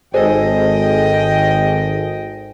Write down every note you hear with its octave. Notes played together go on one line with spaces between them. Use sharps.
G#1 G#4 A4 C5 D#5 G5